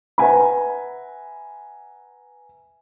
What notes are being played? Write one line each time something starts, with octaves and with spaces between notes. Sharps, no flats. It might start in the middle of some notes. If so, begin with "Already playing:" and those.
B4 E5 F#5 G#5 A#5 B5